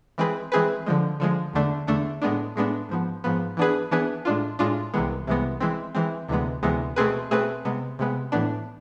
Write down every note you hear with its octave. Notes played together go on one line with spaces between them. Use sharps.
E3 G#3 C4 G#4 B4
E3 G#3 C4 G#4 B4
D3 F3 G#3
D3 F3 G#3
E2 D3 A3 D4
E2 D3 A3 D4
A2 G#3 B3 D4
A2 G#3 B3 D4
G#2 F3 B3
G#2 F3 B3
E3 B3 D4 G#4 B4
E3 B3 D4 G#4 B4
A2 G#3 D4 F4
A2 G#3 D4 F4
C2 C3 E3 G#3 B3
C2 C3 E3 G#3 B3
E3 G#3 C4
E3 G#3 C4
D2 C3 E3 G#3 B3
D2 C3 E3 G#3 B3
B2 A3 C4 G#4 B4
B2 A3 C4 G#4 B4
C3 G#3 B3
C3 G#3 B3
A2 E3 B3 D4